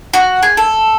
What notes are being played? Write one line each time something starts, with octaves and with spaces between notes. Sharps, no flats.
F#4
G#4
A4